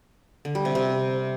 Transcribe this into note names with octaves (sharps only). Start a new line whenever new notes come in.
D3
G3
C3
C3